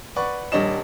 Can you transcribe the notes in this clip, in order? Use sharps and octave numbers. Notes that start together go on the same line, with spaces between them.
B4 D5 F#5 C#6
D#1 G3 D4 C#5 D#5 E7